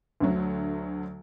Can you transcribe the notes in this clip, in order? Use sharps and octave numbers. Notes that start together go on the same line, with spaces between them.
D2 D3 F#3